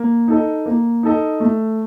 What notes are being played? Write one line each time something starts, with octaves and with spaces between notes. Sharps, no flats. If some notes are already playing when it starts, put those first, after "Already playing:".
Already playing: A#3
D#4 A4 D#5
A#3
D#4 A4 D#5
A3